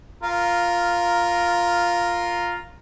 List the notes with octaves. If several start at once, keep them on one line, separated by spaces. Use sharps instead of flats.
F4 A#4